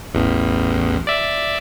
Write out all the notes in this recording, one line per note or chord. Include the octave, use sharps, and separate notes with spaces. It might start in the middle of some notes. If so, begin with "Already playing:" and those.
A1 E2
D5 E5